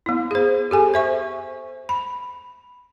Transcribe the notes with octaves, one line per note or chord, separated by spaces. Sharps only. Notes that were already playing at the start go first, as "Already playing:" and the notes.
B3 E4
G#4 C5
G4 A4 G#5
C5 E5 C#6
B5